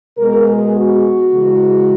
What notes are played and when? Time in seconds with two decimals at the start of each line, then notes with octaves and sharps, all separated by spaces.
0.18 B2 G#3 B3 A#4
0.46 G#4
0.75 F#4
1.31 C#3 E3 G#3